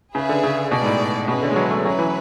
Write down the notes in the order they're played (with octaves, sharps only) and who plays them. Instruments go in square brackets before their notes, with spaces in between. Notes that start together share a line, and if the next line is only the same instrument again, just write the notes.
[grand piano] C#3 [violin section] G#4 B4 E5
[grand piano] D3
C#3
[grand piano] B2 [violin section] G#4 B4 D5
[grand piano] G#2
A2
[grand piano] B2 [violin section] C#4 E4 G#4 B4
[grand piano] D3
G#3
F#3
A3
[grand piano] F#3 [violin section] C#4 E4 B4
[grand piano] E3